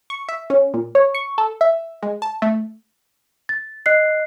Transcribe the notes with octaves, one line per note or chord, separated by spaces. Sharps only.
C#6
E5
C#4
A#2
C#5
C#6
A4
E5
G#3
A5
A3
A6
D#5 F#6 C7